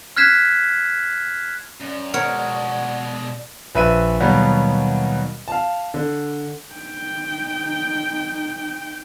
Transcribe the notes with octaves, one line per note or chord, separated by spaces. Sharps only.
F6 F#6 G#6 B6 C7 E7
F#2 D5
B2 G#3 F#4 A#4 C#5
A#1 B4 E5 D#7
D#2 B2 F#3 G3 B3
F5 A5
D3
D#4 G5